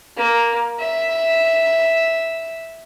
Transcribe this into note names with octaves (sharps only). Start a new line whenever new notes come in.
A#3
E5